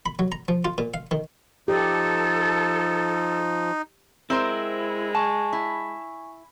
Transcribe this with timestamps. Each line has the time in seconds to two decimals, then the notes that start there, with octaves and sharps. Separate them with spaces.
0.06 B5
0.19 F#3
0.32 A#5
0.48 F3
0.65 F4
0.78 A#2
0.94 F5
1.11 D#3
1.68 F3 D#4 G4 A4
4.30 G#3 C4 E4 A#4 C5
5.15 G#5 A5 C#6
5.53 E4